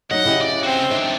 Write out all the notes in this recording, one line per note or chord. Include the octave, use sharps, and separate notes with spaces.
F#3 D#4 D#5 F#5
C#3 E4 G4
D5
C4 F#4 C5
D#3 D4 D#5 E5